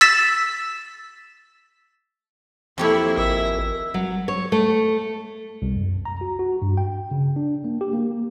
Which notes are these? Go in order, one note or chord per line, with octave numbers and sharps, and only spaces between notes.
E6 A6 B6 E7
F2 A#3 E4 G4 C#5
G#1 A#4 E5
F#3
C#5
A3
C2
F#2
A#5
F#4
F#4
G2
G5
C#3
D4
A#3
G4
A#3